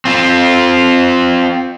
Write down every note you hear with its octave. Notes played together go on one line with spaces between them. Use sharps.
C4 F4